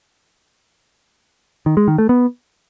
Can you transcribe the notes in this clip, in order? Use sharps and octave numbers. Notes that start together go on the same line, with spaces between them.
D#3
G#3
D#3
A3
B3